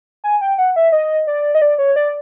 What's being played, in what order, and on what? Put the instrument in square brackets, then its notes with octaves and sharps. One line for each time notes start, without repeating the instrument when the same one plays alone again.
[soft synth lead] G#5
G5
F#5
E5
D#5
D5
D#5
D5
C#5
D5